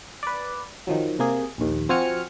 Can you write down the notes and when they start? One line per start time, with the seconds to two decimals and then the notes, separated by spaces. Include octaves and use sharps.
0.23 B4 D5
0.87 D#3 F3 F#3
1.19 C3 A#3 G#4
1.58 A#1 D#2
1.89 F3 C4 F#4 G#5 F6 C#7